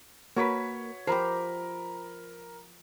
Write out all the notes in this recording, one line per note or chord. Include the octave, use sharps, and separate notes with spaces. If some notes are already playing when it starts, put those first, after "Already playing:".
A#3 F#4 A#4 B4 C#5 C#6 B6
F3 G4 A#4 C5 A#5 B5